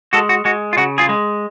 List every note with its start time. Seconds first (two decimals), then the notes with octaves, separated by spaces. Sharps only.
0.13 G#3 F#4 A4
0.29 F#4
0.45 G#3 F#4
0.73 F4
0.77 C#3 F#4
0.98 F4 G#4
1.09 G#3